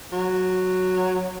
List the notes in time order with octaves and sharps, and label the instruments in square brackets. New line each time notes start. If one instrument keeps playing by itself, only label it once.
[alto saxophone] F#3